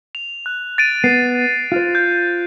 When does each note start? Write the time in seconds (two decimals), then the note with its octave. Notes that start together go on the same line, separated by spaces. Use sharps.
0.15 F7
0.46 F#6
0.78 A6 D7 D#7
1.04 B3 C7
1.72 F4 C5
1.95 G6